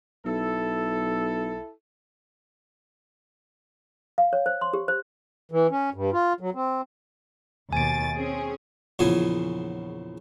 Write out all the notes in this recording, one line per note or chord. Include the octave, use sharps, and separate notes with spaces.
B1 E4 A4
F5
C#5
C5
C6
G4
C5
E3
C#4
G2
F4
F#3
C4
D#2 B2 G#5 A6 D7
C4 C#4 G#4
A#1 E2 C#3 F3 G#4 G#5